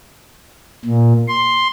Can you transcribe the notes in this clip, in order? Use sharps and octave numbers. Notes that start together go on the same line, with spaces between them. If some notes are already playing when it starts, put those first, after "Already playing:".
A#2
C6